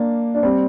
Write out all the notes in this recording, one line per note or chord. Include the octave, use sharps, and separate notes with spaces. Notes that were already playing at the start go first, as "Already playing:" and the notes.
Already playing: A#3 D4
D4
G3 C4